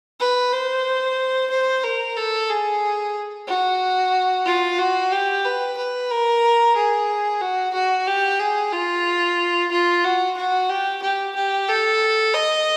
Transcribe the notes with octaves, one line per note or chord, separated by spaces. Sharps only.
B4
C5
C5
A#4
A4
G#4
F#4
F4
F#4
G4
B4
B4
A#4
G#4
F#4
F#4
G4
G#4
F4
F4
F#4
F#4
G4
G4
G4
A4
D#5